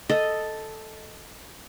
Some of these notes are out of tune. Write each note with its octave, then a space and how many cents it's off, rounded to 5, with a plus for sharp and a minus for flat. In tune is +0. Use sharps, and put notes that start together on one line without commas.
A4 +0 D#5 +0